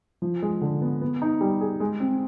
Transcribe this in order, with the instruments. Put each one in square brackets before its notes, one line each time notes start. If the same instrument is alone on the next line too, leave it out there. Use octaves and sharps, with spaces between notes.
[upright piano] F3
G#3
D3
B3
B3
D#4
G3
G#4
G#3
C4